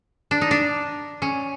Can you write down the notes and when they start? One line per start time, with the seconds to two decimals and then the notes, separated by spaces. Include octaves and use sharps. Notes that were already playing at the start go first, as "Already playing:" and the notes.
0.31 D4
0.41 D#4
0.51 D4
1.22 C#4